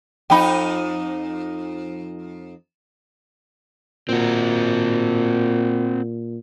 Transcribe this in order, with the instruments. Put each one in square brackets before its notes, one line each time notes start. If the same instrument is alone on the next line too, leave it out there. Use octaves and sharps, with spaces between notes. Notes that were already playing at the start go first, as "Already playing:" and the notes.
[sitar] F2 D#4 [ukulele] G5 B5
[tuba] A#2 [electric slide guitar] C4 F#4